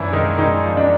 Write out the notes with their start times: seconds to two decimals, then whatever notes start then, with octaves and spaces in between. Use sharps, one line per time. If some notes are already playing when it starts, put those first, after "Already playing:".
Already playing: F#2 E3 F3 D4 E4
0.12 D#3 G#3 D#4
0.38 D#3 G#3 D#4
0.64 F3
0.77 D4